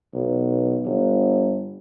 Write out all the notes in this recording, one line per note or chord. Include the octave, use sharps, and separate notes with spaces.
B1
G1